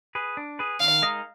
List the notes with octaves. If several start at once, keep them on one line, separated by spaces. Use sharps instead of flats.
G#4 B4
D4
G#4 B4
D#3 F5
G#3 D#4 A#4 D#5